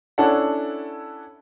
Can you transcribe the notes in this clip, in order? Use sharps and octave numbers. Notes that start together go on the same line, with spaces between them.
C#4 D4 E4 A4 C#5 F#5